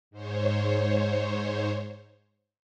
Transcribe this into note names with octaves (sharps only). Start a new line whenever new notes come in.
G#2 C5 C#5